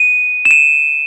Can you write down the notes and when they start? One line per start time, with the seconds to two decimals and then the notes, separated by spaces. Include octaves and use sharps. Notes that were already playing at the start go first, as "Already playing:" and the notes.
Already playing: D#7
0.45 E7
0.51 D#7